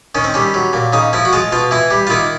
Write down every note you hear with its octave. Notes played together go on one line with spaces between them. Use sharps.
D#3 C#4
C4
G3 C#4
F#3
A#2
C#3 D#4
F3 E4
F#4
G#3 F4
B2 F4
E3 E4
G3
F4
D#3 E4